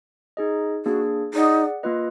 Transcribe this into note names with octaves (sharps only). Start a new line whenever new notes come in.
D#4 G#4 D#5
A#3 D4 F#4 G#4
D#4 G#4 D5 F#5
A#3 F4 B4 D#5